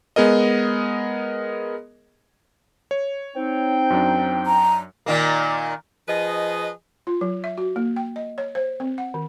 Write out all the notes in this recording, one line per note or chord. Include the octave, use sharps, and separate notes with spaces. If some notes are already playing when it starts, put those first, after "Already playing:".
G#3 B3 G#4 A#4 D#5
C#5
C4 D#4 G5
F#2 F#3 D4
A#5
A#2 D#3 A#3
F3 G#4 B4 D#5
F4
F#3
E5
F#4
A#3
G5
D#5
C#5
C5
C4
F#5
D#3